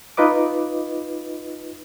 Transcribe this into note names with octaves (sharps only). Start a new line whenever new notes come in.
D#4 F4 B4 D#5 D6